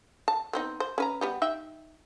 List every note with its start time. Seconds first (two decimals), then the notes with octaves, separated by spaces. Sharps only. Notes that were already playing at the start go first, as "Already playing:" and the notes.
0.28 A5
0.53 B3 C4 D#4
0.80 C5
0.98 C#4 B4 A#5
1.21 G3 B3 G4
1.42 D#4 E5 G5